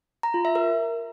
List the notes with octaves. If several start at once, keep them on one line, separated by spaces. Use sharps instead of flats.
A#5
F4
E5
A#4